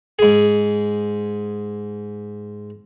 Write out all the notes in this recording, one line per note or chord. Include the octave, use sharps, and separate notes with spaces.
G#2 G#4